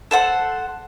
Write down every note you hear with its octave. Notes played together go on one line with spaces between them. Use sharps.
A4 C5 F#5